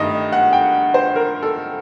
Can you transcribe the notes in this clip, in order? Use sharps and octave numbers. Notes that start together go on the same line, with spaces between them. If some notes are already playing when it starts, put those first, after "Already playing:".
Already playing: G2 D#3 A3 D#5
F#5
G5
C5
A#4
A4